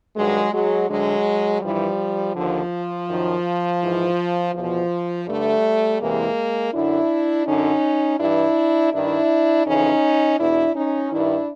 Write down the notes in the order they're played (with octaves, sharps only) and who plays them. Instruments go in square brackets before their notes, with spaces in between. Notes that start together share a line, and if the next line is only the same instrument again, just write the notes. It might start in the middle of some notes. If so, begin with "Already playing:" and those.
[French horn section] G2 D#3 F#3 G#3
F#3 G#3
D2 D3 F#3 G#3
G2 E3 F3 G3
D#2 D3 F3
F#2 D#3
G#2 E3
E2 B2 F3
G2 D3 G3 A3
E2 C3 E3 G#3 A#3
F#2 D3 D4 E4
F#2 D3 C#4 D#4
G2 E3 D4 E4
G2 D#3 D4 E4
F2 C#3 E3 C#4 D#4
E2 B2 D4 E4
C#4 D#4
G2 D#3 D4 E4